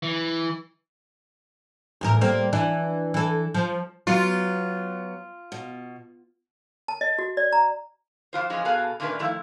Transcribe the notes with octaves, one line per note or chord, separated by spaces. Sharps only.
E3
E2 A2 A#4
G3 A#3 C4
E3 D4
E3 A4
F3
F#3 B3 F4
B2
A5
D#5
F#4
D5
A#5
F2 E3 F4 C5
E3 F3 G#3 C#4
B2 B3 G#4 A4 F5
A#2 D#3 A3 C#4 D4 B4
D#3 F3 A3 E4